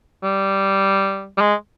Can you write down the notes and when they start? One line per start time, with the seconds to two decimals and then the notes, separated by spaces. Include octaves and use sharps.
0.24 G3
1.38 G3
1.41 G#3